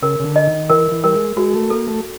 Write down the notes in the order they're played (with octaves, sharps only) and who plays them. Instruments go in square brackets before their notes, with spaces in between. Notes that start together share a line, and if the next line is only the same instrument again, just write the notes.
[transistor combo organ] C#3 [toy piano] A#4
[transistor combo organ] C#3
D3
[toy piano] D#5
[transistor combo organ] D#3
[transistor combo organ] E3 [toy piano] A#4
[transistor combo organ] E3
[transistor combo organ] G3 [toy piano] A#4
[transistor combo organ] G#3
[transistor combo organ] G#3 [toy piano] F#4
[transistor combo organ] A3
[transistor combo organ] A#3 [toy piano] A4
[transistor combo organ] A3